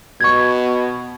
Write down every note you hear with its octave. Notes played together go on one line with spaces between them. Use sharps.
B2 C#6 G#6